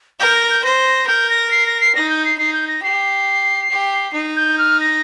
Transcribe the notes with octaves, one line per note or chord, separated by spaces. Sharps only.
A#4 G6
A#6
G6
C5 A#6
A#4 G6
A#6
C7
A#6
C7
D#4 A#6
G6
C7
D#4 C7
G6
A#6
G4 C7
G4
D#4
G6
F6
A#6